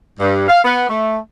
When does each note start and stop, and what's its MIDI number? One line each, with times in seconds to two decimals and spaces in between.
0.20 0.47 43
0.48 0.59 77
0.64 0.87 59
0.88 1.18 57